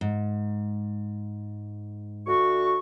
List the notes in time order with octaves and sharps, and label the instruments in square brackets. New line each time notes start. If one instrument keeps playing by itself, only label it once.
[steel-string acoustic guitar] G#2
[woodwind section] D2 F#4 C#6